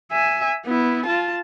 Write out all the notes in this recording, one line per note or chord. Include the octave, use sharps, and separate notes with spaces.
E5 G#5
B3 E4
F4 A5